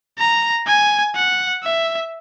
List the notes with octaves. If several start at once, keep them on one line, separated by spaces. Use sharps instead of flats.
A#5
G#5
F#5
E5